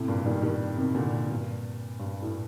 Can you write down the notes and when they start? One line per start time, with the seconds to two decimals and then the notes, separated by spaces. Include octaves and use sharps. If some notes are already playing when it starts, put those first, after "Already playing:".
Already playing: A2 C3
0.08 G2 A#2
0.26 D#3 G3
0.42 D#3 G3
0.77 C3 D#3
0.94 A#2 D3
1.30 G2 A#2
1.99 G2
2.22 A2